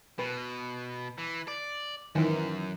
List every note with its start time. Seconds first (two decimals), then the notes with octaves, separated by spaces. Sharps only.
0.19 B2 B4
1.18 E3
1.48 D5
2.15 F#2 D#3 E3